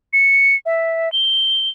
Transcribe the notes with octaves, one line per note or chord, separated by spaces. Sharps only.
C#7
E5
G7